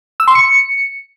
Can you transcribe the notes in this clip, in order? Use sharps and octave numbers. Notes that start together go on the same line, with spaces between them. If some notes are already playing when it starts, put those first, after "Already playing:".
E6
C6
C#7